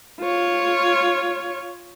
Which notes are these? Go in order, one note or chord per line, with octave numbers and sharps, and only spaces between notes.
F4 C#5